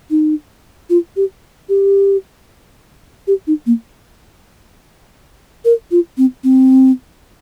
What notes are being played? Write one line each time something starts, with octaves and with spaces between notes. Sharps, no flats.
D#4
F4
G4
G4
G4
D#4
A#3
A#4
F4
C4
C4